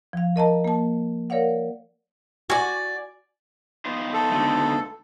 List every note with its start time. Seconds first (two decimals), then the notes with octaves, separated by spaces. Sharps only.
0.13 F3 F5
0.36 A#4 D#5 A5 A#5
0.64 A#3 A5
1.30 A#4 C#5 D5 F5 F#5
2.50 F#4 D5 G#5
3.85 B3 D#4 F4
4.13 A4
4.32 C#2 D3 A3